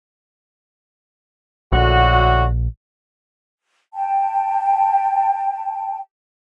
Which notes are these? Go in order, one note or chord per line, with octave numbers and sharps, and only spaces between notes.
A#1 A2 D3 F#4
G5 A5